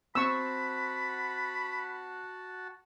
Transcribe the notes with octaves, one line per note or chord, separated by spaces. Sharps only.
C4 F#4 F#5 A5 B5 C#6 E6